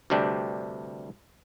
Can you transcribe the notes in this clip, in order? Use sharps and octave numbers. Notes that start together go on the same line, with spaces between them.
D2 G2 C3 D4 G5